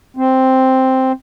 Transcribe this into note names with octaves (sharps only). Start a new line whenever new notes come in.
C4